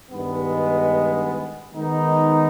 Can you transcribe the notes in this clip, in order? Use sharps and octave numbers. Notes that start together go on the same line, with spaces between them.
G2 D#3 G#3 B3
D#3 G#3 B3 D#4